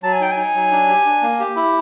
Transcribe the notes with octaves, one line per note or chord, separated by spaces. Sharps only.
F#3 A5
G#5
D#4 G5
G#5
D#4
F#3
D4
G4
D4
A#3
G4
E4